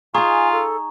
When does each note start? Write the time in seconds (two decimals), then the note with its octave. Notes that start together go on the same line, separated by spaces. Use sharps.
0.15 D#4 F4 G#4 G#5 A#5 C#6
0.52 A4